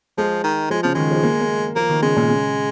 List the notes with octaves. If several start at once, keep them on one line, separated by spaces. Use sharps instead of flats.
F3 G#3
D#3
F3 G#3
C#3 F3
D#3 G#3
F3
A#3
A#3
F3 A#3
D#3
C#3 G#3
A#2
C#3